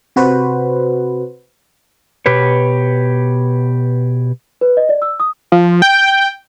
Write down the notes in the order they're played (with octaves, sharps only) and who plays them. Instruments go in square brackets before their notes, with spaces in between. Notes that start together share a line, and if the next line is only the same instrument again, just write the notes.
[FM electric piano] C3 F#4 B4 C5
[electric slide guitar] B2 G4 B4 C#5
[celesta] B4
D#5
D5
E6
D#6
[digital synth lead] F3
G5